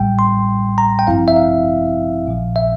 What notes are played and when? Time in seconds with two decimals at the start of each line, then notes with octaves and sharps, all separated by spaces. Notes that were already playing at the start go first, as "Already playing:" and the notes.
Already playing: A1 A2 G3 G5
0.19 C6
0.78 A#5
0.99 G5
1.07 A1 G2 F3 C4 E4 F5
1.28 E5
1.37 F5
2.26 A#1 A#2 F3
2.56 E5